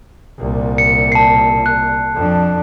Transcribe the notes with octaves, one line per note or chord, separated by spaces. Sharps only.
C2 A#2
C#7
A5 C7
F#6
F2 D4